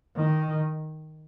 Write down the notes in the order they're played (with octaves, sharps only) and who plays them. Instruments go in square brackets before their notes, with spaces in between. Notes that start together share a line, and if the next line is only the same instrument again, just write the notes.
[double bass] D#3